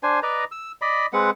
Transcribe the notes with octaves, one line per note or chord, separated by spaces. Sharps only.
D4 C5 G#5
B4 D5 D#5 A#5
E6
D5 D#5 B5
G#3 C4 B4 F#5